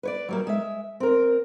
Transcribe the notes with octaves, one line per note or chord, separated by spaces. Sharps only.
B4 C#5 D5
F#3 G3 A#3
G#3 E5
C4 A#4